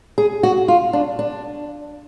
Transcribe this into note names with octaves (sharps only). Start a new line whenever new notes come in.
G#4
F#4
F4
D4
D4